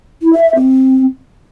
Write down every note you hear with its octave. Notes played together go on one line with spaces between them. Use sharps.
E4
E5
E5
C4